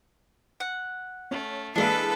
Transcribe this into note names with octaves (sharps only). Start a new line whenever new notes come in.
F#5
A3 C#4
E3 G#3 A#3 D4 E4 A4 B4